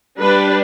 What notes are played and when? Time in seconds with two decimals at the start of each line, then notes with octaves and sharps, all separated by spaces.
0.19 G3 D4 B4